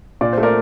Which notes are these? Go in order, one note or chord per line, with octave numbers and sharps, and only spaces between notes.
A#2 D5
A3 C5
A#4 D5